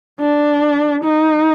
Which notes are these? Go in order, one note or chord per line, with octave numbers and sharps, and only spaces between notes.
D4
D#4